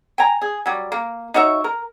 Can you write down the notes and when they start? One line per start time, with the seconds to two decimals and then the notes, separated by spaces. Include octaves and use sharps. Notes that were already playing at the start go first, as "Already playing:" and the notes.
0.18 G5 G#5 A#5
0.42 G#4
0.66 F#3 G3
0.92 A#3
1.34 D#4 F#4 C#5 E5
1.64 A#4